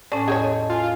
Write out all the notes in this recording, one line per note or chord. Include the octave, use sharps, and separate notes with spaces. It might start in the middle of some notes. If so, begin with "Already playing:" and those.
A2 C#4 A4 D5 G#5 A5
E2 G#4 A4 C#5 D#5 A5 G6
F4 G#5 C6